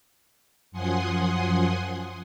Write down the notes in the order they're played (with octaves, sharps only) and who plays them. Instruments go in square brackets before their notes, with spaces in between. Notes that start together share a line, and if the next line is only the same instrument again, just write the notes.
[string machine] F#2 F3 F#5 G#5 C6 D#6